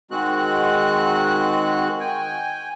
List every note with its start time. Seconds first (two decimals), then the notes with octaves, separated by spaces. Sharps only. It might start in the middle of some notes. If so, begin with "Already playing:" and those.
0.11 D#3 G#3 C4 F#4 F#6
2.00 G5 G#5